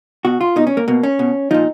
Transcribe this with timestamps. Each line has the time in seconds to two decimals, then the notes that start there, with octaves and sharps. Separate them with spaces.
0.25 B2 F#4
0.41 F4
0.56 B2 D#4
0.67 C#4
0.77 A#3
0.88 B2 A#3
1.03 C#4
1.19 B2
1.51 A#2 F3 D#4